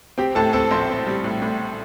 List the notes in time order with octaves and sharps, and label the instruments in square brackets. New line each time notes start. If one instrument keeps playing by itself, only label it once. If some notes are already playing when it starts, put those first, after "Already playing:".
[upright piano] C4 [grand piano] G4 G5
[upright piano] A2 [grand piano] A4 A5
[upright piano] C4 [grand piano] A4 A5
[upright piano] A#1 [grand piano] C5 C6
[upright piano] C4
G3
A2
A2